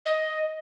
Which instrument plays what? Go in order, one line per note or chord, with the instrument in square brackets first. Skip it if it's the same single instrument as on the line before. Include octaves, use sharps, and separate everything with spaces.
[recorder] D#5